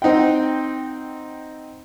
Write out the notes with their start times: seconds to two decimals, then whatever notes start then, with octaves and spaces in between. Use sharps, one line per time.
0.02 C4 D#4 F#5 G5